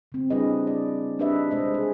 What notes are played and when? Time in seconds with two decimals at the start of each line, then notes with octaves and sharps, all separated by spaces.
0.12 C#3 C4
0.30 G3 D4 E4 G#4 B4 D#5
0.67 D5
1.19 D4 D#4 G4 B4 D#5 E5
1.51 C3 G#3 C5 D#5
1.74 G#4